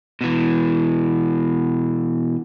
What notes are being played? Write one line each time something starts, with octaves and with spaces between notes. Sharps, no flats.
B2 E3